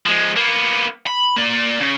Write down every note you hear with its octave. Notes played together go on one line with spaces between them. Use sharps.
F3 G#3
A#3 B3
B5
A#3 D5
C#3